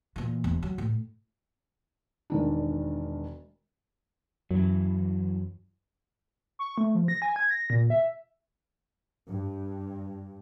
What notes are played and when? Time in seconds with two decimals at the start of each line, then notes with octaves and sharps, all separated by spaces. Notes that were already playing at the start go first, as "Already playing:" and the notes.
0.16 A#2 E3
0.44 E1
0.63 F#3
0.78 A2
2.30 E1 D#3 D4
4.51 F#2 E3 F#3
6.59 C#6
6.78 A3
6.95 F3
7.08 A#6
7.22 G#5
7.36 G#6
7.51 A#6
7.70 A#2
7.90 E5
9.27 G2